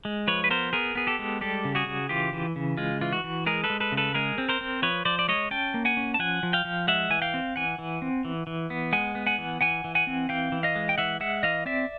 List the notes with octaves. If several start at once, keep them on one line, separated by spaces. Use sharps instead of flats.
G#3
F3 B4 C#5
B4
B3 A#4 C5
B3 G#4 A#4
B3 G#4
G4 A4
G#3
G3 G4 A4
C#3
F#4 G#4
C#3
E3 F4 G4
E3
C#3
G#3 F4
E3 F4
F#4
E3
G#3 G#4 A#4
A4 B4
G#3
A4 B4
C#3
A4 B4
G#3 G#4 A#4
C4
A#4 C5
C4
F3 B4 C#5
F3 C5 D5
D5
G#3 C#5 D#5
C#4 G5 A5
A#3
F#5 G#5
C#4
A5
F3 F#5 G#5
F3
F5 G5
F3
G#3 E5 F#5
E3 G#5
F5 G5
C4
E3 F#5 G#5
E3
C4
E3
E3
B3
G#3 F#5 G#5
B3
F#5 G#5
E3
E3 F#5 G#5
E3
F#5 G#5
C4
E3 F5 G5
E3
D#5 F5
G#3
G5
E3 E5 F#5
G#3 E5 F#5
E3 D#5 F5
C4 D5 E5